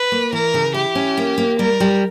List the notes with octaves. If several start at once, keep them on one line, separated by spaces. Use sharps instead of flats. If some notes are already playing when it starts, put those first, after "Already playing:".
Already playing: B4
A#3
E3 A#4
C#3
E4 G4
C#4
A#3
A#3
G3 A#4
G3